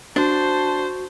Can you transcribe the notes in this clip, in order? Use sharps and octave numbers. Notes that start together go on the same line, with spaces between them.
D4 F#4 C5 A5